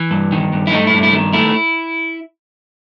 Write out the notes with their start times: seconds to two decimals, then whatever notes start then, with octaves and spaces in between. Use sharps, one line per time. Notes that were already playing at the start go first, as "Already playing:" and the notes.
Already playing: E3
0.11 G2
0.32 D#3
0.53 G2
0.67 E4
0.72 A3 D#4
0.87 E4
0.93 G2
1.03 E4
1.13 D#3
1.33 A3 E4